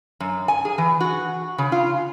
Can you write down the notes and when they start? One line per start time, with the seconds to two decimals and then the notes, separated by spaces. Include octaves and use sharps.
0.20 F#2
0.48 G#5
0.65 G#4
0.78 E3
1.00 F#4
1.58 C#3
1.72 F4